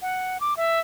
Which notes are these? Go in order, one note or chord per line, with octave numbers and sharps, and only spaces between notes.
F#5
D6
E5